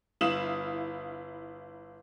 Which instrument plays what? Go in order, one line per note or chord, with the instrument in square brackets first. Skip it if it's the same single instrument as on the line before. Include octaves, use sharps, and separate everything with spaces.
[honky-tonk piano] G1 E4 F5 D#6 E7 F#7